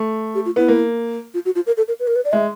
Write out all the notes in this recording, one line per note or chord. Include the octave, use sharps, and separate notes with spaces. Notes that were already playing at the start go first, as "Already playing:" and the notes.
Already playing: A3
G4
F4
B3 E4
A#3
F4
F#4
F4
A#4
A4
A#4
B4
A#4
B4
D5
G#3 E5